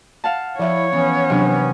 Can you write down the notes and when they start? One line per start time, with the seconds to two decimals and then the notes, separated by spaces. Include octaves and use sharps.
0.24 F5 F#5 A5
0.59 F3 E4 C#5 E5
0.93 E3 B3 C#4
1.30 C3 F#3 D4